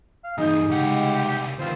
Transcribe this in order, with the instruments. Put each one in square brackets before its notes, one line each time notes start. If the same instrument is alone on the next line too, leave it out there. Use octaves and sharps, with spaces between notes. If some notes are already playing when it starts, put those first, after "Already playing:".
[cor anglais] F5
[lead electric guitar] G2 E3 [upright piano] D#4 G6 [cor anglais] G#4
[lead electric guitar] C2 F#5 [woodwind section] C#3 G#3 [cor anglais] G4
[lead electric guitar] D2 E3 [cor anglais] C4 [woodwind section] F4 A#4 C5